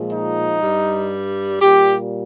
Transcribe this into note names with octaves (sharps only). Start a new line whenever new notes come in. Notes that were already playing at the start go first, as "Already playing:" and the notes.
Already playing: A#2 F3 G#3
D#4
G2 G3
A#2 G3 G4